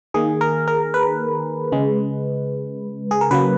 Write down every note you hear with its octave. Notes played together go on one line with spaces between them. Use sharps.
D#3 A#3 G#4
A#4
A#4
B4
C#3 G#3
G#4
A#4
C#3 F#3 A#3 B4